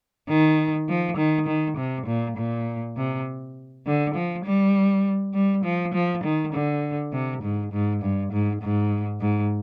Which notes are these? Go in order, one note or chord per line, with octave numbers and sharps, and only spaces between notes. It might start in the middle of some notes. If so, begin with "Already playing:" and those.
D#3
F3
D#3
D#3
C3
A#2
A#2
C3
D3
F3
G3
G3
F3
F3
D#3
D3
C3
G#2
G#2
G2
G#2
G#2
G#2